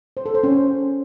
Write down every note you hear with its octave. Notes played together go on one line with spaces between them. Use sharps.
C5
A4
C5
C#4